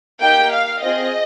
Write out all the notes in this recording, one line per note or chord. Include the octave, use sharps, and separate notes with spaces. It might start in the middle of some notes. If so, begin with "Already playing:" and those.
A#3 D#4 G4 G5
F5
C4 F4 G#4 D#5